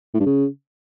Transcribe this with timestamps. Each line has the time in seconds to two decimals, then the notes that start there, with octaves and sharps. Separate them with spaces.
0.14 A2
0.20 G2
0.26 C#3